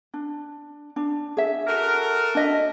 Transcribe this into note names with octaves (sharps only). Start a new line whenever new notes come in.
D4
D4
G#4 E5
F#4 A4 A#4
D4 D#5 E5